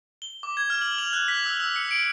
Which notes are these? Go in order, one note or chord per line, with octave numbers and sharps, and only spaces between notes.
G7
D6
G#6
F6
F#7
F7
F#6
B6
E6
E6
C#7
D7